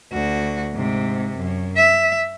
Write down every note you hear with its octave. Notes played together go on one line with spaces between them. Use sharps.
D2 F#4
G#2 C3
F#2
E5